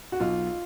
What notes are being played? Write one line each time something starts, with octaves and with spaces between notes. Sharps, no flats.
F#4
B1 F4